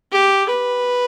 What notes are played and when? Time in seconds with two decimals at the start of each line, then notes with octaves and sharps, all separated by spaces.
0.11 G4
0.49 B4